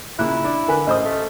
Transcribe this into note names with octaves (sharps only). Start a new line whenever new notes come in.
A#2 C#3 E4 F#6
D4
D3 A#4 B4 G#5
A1 C5 D#5 D#6
A3